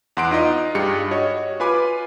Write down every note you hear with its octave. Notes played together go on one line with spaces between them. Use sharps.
E2 F#5 C6 F#6 D7
D#4 F4 D#5
G2 G4 G#4 C#7
F#4 C#5 D#5
F4 B4 G#5 B5 D6